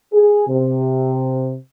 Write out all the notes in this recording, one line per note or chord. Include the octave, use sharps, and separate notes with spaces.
G#4
C3